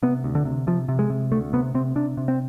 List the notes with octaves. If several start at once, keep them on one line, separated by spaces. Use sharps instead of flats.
C3 B3
D2
D3
C3
C3 F3
C3
G#3
C3
D2 A3
C3 B3
C3 C4
C3 D4
C3
C4